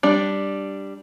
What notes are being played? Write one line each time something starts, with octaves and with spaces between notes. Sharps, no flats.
G3 D4